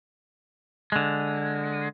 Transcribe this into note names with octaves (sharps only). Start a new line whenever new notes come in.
D3 G#3